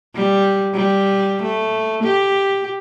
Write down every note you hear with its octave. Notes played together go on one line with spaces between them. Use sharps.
G3
G3
A3
G4